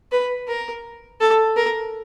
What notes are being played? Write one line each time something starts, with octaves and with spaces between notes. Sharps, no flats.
B4
A#4
A4
A#4